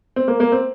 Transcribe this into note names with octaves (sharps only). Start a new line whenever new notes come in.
C4
A#3
A#3
C4